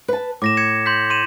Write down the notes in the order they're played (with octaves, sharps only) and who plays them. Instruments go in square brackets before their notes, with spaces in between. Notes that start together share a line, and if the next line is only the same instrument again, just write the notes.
[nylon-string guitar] B4 A5
[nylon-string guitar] A2 [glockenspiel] D6 A#6 E7
[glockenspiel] G#6 C#7 E7
C6 G6 B6
C6 D#7 E7